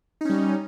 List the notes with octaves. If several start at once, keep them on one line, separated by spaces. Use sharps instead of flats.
G3 C#4 D#4